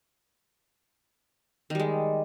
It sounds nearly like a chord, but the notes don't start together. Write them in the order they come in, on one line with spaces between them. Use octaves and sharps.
D#3 G3 G#3